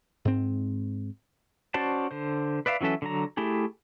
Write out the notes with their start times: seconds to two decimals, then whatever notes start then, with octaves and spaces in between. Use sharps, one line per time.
0.25 G#2 C4
1.74 C#4 F#4 C5 D5 A5
2.11 D3 C5
2.66 B4 D5 E5 F5
2.81 E3 F#3 C#4 A4 E5
3.02 D3 F#3 A#5
3.37 A3 E4 G4 G#4